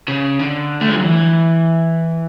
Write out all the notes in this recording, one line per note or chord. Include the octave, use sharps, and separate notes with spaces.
C#3
D3
A3
G#3
F#3
E3